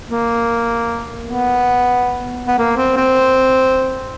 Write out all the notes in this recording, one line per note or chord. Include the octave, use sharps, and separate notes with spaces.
A#3
B3
B3
A#3
C4
C4